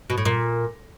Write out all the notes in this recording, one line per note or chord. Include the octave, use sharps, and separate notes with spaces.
B2
A2
A#2